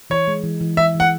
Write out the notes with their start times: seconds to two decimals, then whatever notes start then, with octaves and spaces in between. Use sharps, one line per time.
0.10 E3 C#5
0.28 G#3
0.44 E3
0.61 E3
0.77 E3 E5
0.95 E3
1.00 F#5